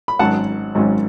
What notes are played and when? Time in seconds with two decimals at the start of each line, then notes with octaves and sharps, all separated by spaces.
0.08 B5
0.19 G#1 G#2 F#3 C#4 F#5 A5
0.75 G#1 G#2 F#3 C#4